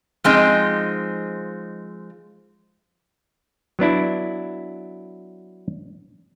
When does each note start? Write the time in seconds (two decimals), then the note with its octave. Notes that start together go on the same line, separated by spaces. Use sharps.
0.24 F3 G#3 C4 D#4
3.79 F#3 B3 D4 E4